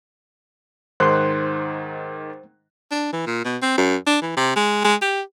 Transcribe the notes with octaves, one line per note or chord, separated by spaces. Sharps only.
G#2 D#3 C5 C6 F#6
D4
E3
A#2
B2
C4
F#2
D4
E3
C3
G#3
G#3
G4